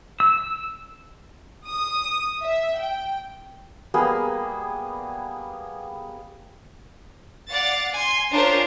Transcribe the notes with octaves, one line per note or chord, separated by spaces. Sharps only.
E6
D#6
E5
G5
G3 A#3 B3 G#4
D5 F5 F#5 A6
G#5 C6
C#4 D4 F4 A#4 C5